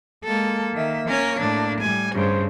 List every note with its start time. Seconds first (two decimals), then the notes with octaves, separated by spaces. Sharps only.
0.24 G#3 A#3 A4
0.75 D#3 E5
1.07 C#4 A#4 C#5
1.39 A2 D4
1.81 A2 G3 G#5
2.14 G2 C#3 C5